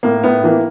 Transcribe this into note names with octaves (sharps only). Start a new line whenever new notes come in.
A2 A#3
A2 B3
E3 A#3